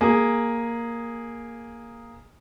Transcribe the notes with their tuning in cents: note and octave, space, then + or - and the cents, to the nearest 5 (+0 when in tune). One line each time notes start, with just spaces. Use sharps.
A#3 +0 G#4 +0